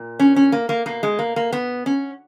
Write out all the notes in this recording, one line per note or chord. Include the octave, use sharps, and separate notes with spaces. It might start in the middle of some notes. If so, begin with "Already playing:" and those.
Already playing: A#2
C#4
C#4
A#3
A#3
B2 A#3
G#3
A#3
A#3
B3
C#4